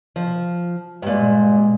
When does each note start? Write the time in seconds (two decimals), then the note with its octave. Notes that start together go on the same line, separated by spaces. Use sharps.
0.16 F3
1.02 G2 A#2 G#3